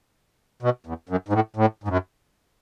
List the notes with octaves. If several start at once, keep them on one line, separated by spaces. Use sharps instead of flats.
B2
E2
F#2
G#2
A2
A2
G#2
F#2